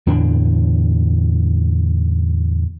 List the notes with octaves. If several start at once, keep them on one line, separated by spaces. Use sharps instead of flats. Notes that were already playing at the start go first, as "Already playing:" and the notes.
E2 A2 D3 D4